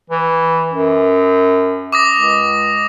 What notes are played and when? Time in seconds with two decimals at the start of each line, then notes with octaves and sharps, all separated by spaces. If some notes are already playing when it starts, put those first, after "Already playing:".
0.10 E3
0.72 F#2
1.93 D6 D#6 A#6
2.16 C#2